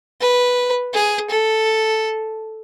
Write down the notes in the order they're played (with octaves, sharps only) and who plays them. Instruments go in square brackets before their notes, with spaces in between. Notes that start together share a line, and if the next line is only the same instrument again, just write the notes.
[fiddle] B4
G#4
A4